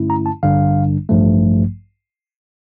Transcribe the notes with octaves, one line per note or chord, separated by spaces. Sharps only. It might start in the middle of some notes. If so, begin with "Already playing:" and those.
Already playing: G2 D3 A3 C#4 E4
A#5
A5
A1 G2 D3 G3 D4 F5
A1 G2 F3 A3